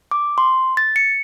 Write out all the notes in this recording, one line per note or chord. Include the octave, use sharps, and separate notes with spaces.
D6
C6
A6
C#7